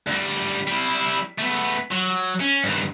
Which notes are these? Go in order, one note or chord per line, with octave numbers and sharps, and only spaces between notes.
D2 G3
G3 E4
A3 B3
F#3
C#4
G2 D#3